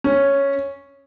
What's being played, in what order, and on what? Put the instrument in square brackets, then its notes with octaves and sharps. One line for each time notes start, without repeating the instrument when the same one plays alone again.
[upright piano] C#4